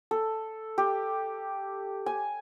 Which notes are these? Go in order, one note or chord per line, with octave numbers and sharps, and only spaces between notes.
A4
G4
G#5